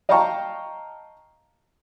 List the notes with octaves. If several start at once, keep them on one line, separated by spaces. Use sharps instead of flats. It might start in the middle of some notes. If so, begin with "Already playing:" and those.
D#5 F5 G5 A5 A#5 C#6